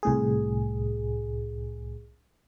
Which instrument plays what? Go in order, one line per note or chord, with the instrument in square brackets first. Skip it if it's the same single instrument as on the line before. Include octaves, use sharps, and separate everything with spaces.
[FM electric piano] C2 A2 G#4